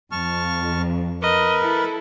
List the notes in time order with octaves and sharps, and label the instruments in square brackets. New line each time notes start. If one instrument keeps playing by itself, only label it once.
[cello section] F2 [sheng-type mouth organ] A5 C#6 F6
[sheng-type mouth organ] A#4 B4 [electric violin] D#5
[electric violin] E4 [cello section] A4